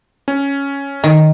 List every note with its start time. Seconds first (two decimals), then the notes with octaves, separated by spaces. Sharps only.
0.28 C#4
1.04 D#3